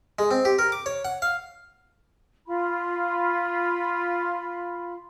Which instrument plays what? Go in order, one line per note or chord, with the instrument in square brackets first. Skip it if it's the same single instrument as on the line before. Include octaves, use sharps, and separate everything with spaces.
[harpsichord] G#3
C4
G4
A#4
D6
C#5
F#5
F5
[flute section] F4 B5 C6